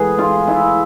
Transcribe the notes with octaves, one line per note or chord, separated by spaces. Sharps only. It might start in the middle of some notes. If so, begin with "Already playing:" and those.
Already playing: A2 E3 G#3 B3 G#4 B4
F4
E4